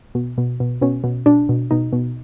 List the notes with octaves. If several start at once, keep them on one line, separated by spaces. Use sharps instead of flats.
B2
B2
B2
B2 C#4
B2
B2 D4
B2
B2 D#4
B2